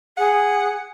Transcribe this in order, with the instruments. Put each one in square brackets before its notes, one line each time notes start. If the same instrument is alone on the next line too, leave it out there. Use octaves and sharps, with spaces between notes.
[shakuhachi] G#4 [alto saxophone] F#5